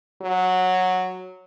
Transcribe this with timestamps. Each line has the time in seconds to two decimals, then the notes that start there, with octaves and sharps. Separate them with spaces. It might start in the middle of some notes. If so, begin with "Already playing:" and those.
0.22 F#3